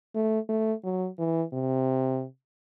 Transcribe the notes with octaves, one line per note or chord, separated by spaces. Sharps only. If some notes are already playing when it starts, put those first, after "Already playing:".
A3
A3
F#3
E3
C3